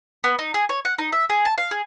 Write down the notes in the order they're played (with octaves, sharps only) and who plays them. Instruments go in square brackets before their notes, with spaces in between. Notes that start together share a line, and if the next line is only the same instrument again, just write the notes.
[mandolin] B3
D#4
G#4
C#5
F#5
D#4
E5
G#4
A5
F5
G#4